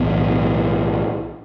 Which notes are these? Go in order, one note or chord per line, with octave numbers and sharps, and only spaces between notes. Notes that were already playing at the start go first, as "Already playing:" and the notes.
Already playing: B1 A2 E3 B3